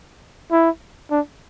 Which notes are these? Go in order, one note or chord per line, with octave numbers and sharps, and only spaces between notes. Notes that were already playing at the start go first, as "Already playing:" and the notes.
E4
D4